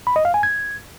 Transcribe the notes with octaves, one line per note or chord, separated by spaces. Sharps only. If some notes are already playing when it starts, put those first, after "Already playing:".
B5
D#5
F5
G#5
G#6